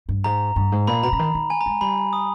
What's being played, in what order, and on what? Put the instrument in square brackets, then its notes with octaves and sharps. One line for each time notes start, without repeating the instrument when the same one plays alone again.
[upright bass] G2
[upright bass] G#2 [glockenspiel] A#5
[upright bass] G2
G#2
[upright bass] A#2 [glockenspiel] B5
[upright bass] B2 [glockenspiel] A#5
[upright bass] C#3
D#3
D#3
[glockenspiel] G#5
A#5
[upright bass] G#3
[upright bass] G3 [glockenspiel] B5
[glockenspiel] D#6